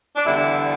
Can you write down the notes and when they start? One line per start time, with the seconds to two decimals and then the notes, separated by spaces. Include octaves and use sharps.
0.16 D4
0.25 E2 D3 G3 E4